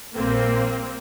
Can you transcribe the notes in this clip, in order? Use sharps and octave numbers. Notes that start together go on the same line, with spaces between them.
A#1 A#2 G3 A#3 C4